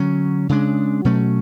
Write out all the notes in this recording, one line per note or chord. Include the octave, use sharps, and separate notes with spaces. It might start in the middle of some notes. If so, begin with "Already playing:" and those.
Already playing: D3 F#3 C#4
C#3 G#3 D4
B2 F#3 A3 C#4